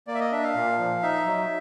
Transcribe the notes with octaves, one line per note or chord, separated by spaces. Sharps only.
A#3 D5
E5
D#5
D4 E5
F5
A#2
F3
D#4 E5
F#3